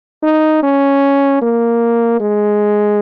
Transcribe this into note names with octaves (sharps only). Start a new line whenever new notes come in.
D#4
C#4
A#3
G#3